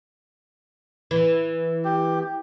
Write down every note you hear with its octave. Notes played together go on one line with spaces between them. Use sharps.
E3
G4